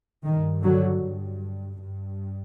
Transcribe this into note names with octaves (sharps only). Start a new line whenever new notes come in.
G2 D#3
D3 F#3
G2
G2